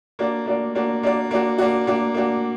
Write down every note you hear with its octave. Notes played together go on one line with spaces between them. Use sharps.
A#3 D4 F#4 D5
A#3 D4 F#4 D5
A#3 D4 F#4 D5
A#3 D4 F#4 D5
A#3 D4 F#4
A#3 D4 F#4
A#3 D4 F#4
A#3 D4 F#4